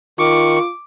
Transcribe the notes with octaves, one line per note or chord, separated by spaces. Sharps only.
D#3 F4 C#6 D6